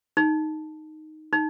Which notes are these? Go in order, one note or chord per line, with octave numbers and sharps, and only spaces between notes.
D#4
D#4